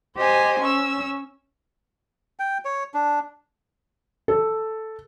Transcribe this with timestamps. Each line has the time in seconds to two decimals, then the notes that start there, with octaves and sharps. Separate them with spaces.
0.17 G4 C5 D#5 G#5
0.62 C#4 C#6 E6
2.39 G5
2.65 C#5
2.94 D4
4.28 A4